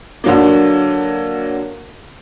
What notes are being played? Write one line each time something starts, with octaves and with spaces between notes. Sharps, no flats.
D3 F#3 A#3